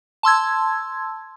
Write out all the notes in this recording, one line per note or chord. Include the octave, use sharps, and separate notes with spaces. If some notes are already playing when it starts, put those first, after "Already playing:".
A5 C6 E6 G#6